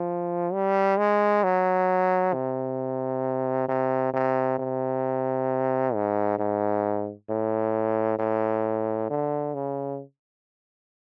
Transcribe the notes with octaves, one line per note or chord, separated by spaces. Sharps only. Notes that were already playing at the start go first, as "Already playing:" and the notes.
Already playing: F3
G3
G#3
F#3
C3
C3
C3
C3
G#2
G#2
A2
A2
D3
C#3